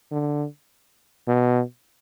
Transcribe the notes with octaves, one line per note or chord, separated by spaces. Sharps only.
D3
B2